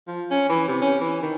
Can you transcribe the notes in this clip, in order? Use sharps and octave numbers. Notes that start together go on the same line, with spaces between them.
F3
C#4
E3
C3
C#4
E3
D#3